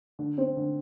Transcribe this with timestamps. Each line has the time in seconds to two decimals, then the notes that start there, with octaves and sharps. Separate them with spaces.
0.19 D3
0.38 C4
0.57 D3